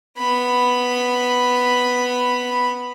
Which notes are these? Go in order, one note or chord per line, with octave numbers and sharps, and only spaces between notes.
B3 B5